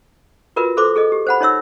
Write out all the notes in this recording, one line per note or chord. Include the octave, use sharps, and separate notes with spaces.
F4 F#4 A#4 B4 E5
A4 C5 E5 C6 D6
G#4 A4 D#5
G4
C5 F#5 B5
D#4 C#5 E5 E6